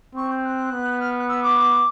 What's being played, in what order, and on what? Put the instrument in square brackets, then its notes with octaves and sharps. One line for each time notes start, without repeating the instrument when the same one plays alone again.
[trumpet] C4 [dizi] C#6
[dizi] G6
F#6
[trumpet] B3
[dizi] F6
F#6
E6
D6